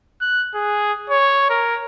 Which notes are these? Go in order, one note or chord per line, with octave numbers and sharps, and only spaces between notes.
F#6
G#4
C#5
A#4